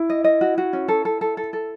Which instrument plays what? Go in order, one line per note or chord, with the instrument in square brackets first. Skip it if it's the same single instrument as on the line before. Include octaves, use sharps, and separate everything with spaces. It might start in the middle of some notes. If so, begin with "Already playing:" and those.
Already playing: [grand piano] E4
[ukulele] D#5
D#5
F#4
F#4
C#4
A4
A4
A4
A4
A4